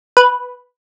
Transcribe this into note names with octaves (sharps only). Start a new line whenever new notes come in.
B4